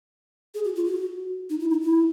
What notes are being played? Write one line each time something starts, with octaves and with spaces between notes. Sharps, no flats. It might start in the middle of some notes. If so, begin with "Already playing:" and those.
G#4
F#4
F4
F#4
D#4
E4
D#4
E4